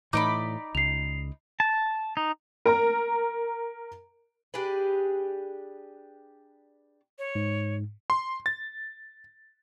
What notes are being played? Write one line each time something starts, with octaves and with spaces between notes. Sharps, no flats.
A2 E3 D#4 D5 B5 D6
C#2 C7 F7
A5
D#4
A#4 A#5
D4 G4 G#4 B4
C#5
G#2
C6
A6